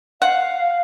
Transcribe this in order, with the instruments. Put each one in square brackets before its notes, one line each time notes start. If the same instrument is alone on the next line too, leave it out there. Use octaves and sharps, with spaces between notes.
[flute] F5 [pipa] F#5